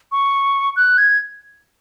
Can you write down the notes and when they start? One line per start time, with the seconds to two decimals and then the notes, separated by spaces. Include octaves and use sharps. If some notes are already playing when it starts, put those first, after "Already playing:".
0.12 C#6
0.76 F#6
0.98 G#6